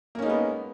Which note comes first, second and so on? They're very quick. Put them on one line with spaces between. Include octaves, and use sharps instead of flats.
A#3 C#4 D#4 G#3 B3